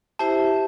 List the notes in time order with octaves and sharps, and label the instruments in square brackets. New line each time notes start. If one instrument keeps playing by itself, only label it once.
[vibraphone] E4 G4 C5 E5 [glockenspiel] A5